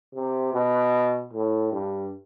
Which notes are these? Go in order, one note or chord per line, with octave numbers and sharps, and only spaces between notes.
C3
B2
A2
G2